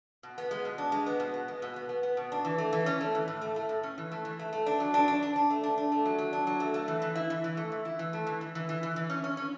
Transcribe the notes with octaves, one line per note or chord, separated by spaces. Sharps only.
B2
B3
G#3
B2
D4
G#3
B3
B2
B3
G#3
B2
B3
B3
B3
B2
D4
E3
A3
E3
C#4
A3
E3
A2
A3
A3
A2
C#4
E3
A3
E3
A3
A3
D4
F#3
D4
D4
D4
D4
A3
D4
D4
A3
F#3
F#3
D4
F#3
A3
A3
E3
E3
E4
E3
E3
A3
E3
E4
E3
A3
E3
E3
E3
E3
E3
E3
C#4
C#4
C#4